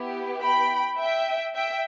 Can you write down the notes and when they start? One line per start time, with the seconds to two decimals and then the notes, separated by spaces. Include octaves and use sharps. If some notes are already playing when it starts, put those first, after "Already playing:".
Already playing: B3 E4 G4
0.41 G5 B5
0.98 E5 G5
1.55 E5 G5